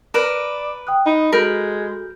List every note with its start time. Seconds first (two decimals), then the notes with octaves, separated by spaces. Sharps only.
0.14 A#4 B4 D5 E7
0.87 G5 D#6 F#6
1.06 D#4 B5
1.32 G#3 F#4 A4 A#4 B5 G6